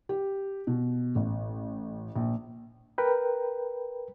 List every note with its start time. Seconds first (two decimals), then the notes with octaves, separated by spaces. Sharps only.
0.09 G4
0.67 B2
1.15 A1
2.16 A#1
2.98 A#4 B4 G5